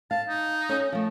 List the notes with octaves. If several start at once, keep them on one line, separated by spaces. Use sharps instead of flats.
F5 A5
D#4
C#4 A4 G#5
F3 A3